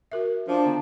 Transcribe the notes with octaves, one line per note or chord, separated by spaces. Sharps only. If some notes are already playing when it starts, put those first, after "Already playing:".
F#4 A#4 E5
F3 D4
D3 B3